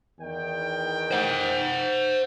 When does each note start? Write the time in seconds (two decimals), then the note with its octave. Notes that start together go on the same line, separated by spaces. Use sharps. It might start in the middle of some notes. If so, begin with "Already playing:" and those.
0.20 E2 D#3 G5
1.11 C5 F#5